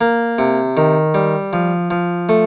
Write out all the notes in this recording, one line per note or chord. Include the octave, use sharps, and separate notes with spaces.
A#3
C3
D#3
G3
F3
F3
A3